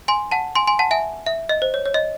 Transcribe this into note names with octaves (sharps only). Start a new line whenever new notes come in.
G#5 C6
F#5 A5
G#5 C6
G#5 C6
F#5 A5
E5 G#5
E5
D#5
C5
C#5
C#5
D#5